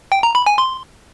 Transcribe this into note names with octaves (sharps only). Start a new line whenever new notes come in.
G5
A#5
B5
G#5
C6